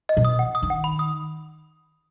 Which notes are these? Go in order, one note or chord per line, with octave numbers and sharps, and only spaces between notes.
D#5
B2
D#6
F#5
D#6
D#3
F#5
B5
D#6